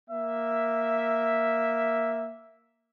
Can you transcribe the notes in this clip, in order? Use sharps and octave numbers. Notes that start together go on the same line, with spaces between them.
A#3 E5